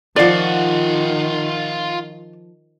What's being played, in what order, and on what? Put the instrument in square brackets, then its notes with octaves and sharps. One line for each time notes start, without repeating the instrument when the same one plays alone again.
[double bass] D#3 [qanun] F3 C6 [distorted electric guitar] F4 F#5 [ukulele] D5 F5